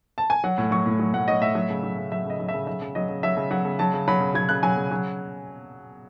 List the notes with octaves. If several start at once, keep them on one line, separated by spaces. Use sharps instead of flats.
A5
G#5
F#3 F#5
A2
F#3 C#6
A2
F#3
A2 F#5
F#3 D#5
A2 E5
F#3
C#3
F#3
C#3
F#3 E5
C#3 D#5
F#3
E5
C#3
F#3 E5
C#3
F#3 D#5
C#3
F#3 E5
C#3
F#3 F#5
C#3
F#3 A5
C#3
F#3 B5
C#3
F#3 G#6
C#3 F#6
F#3 G#5
C#3
F#3